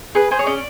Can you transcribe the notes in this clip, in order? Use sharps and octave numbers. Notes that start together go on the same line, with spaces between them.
G#4 B4
G#4 C5
C#5
C#4 D5